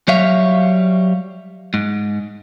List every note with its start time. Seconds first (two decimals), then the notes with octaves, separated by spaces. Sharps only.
0.08 F#3 G3 C#5 E5 F5
1.74 G#2